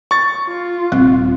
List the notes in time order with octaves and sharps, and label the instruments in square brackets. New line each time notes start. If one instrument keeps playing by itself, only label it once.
[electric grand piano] C#6 A6
[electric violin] F4
[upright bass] D#1 [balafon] C4